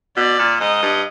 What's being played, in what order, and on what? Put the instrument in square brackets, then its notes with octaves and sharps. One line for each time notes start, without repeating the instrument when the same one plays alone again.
[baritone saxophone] B2 [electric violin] D5
[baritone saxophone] A#2
[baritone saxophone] G#2 [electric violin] D#5
[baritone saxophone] G2